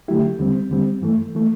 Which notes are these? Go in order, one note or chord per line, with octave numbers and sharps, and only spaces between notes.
D3 F#3 A3 E4 G4
E2 D3 G3 C4
E2 D3 G3 C4
G2 E3 A3
E3 A3